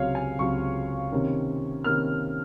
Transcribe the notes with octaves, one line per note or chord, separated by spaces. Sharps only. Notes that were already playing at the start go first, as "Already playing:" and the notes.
Already playing: C#2 C3 F#3 C#5 F5
G#5
C#2 C3 F#3 C#6
C3 D#3 A#3 C#4
C3 D#3 A#3 C#4 F6